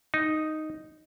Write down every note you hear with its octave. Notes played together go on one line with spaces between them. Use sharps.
D#4